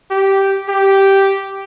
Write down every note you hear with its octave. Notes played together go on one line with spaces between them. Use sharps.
G4
G4